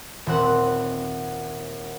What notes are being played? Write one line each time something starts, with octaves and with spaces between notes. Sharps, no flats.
D#1 C4 F#5